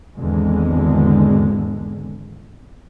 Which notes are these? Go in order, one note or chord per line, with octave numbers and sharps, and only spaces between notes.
G#1 E2 D3 G#3